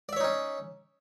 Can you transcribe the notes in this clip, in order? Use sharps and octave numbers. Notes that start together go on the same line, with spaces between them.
C#4 D#4 C#5 D5 E5